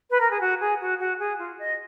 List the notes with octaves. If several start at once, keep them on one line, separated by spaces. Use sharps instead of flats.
B4
A#4
G#4
F#4
G#4
F#4
F#4
G#4
F4
D#5